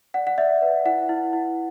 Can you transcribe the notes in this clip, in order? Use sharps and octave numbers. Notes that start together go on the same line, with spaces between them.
D5 F#5
F#5
D5 E5
B4
E4 F#5
E4
E4